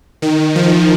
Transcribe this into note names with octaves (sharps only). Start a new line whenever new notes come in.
D#3
F3